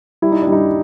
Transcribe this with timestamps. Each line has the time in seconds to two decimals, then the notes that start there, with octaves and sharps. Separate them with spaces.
0.22 G3 E4
0.32 D#4
0.42 D4
0.47 G3
0.52 D#4